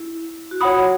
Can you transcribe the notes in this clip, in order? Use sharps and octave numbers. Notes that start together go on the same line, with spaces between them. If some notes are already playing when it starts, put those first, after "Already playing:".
Already playing: E4
F#4
F4 C#5 F#5 B5 D#6